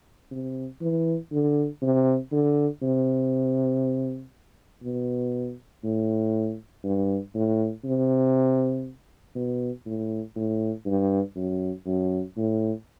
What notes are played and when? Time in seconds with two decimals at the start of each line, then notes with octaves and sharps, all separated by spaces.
0.31 C3
0.81 E3
1.32 D3
1.82 C3
2.32 D3
2.82 C3
4.83 B2
5.84 A2
6.84 G2
7.35 A2
7.85 C3
9.35 B2
9.86 A2
10.36 A2
10.86 G2
11.36 F#2
11.86 F#2
12.37 A2